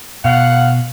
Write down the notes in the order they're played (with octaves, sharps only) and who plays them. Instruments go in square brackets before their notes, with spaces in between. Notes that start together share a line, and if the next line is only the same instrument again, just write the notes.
[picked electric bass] B2 [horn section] F5 F#5